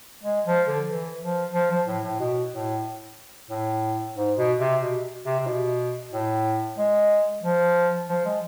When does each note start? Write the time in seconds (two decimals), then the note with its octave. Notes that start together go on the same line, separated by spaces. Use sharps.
0.23 G#3
0.46 F3
0.67 D3
0.89 E3
1.21 F3
1.54 F3
1.70 F3
1.87 A2
2.04 A2
2.19 B2
2.53 A2
3.50 A2
4.17 G#2
4.38 B2
4.60 C3
4.81 B2
5.25 C3
5.39 C3
5.47 B2
6.13 A2
6.78 G#3
7.43 F3
8.09 F3
8.25 G#3